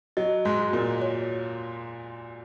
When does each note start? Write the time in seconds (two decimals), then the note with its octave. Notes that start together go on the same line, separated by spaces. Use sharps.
0.17 F#3 D#5
0.45 G#2 G#3
0.59 F#4
0.73 A#2 A#3
1.02 C#5